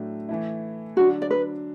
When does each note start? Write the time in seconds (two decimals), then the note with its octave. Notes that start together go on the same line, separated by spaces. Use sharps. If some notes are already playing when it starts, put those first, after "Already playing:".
Already playing: A2 F#3 A3 D4
0.29 E3 A3 E4
0.97 D3 F#3 D4 F#4
1.22 D5
1.31 B4